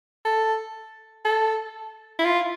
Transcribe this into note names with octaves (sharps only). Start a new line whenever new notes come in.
A4
A4
E4
F4